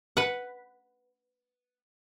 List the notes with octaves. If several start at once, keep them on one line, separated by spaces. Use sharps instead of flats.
B4 F#5